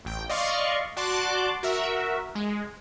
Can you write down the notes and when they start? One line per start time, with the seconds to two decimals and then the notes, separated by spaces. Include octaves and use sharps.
0.05 A1 G5
0.29 D5 D#5 F5 C6 C#6
0.97 F#4 D5 A5 C6 D6 F#6
1.63 F#4 A#4 E5
2.35 G#3